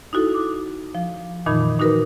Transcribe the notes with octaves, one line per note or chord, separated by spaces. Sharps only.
D#4 E4 F#4 A4
D6
F3
F2 A#2 D#3 E3 D#4 B5
A#2 D#4 F#4 A#4 B4